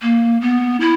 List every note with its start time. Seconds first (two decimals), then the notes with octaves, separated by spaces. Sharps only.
0.02 A#3
0.41 B3
0.81 E4